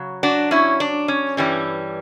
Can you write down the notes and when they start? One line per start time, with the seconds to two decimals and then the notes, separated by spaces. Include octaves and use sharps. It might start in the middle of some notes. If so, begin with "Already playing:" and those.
Already playing: C#3 F#3
0.23 D4 F#4
0.51 C#4 E4
0.80 D4
1.08 C#4
1.37 G2 E3 G3 C#4